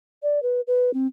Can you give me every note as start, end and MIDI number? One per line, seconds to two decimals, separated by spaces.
0.23 0.42 74
0.43 0.61 71
0.67 0.93 71
0.94 1.07 60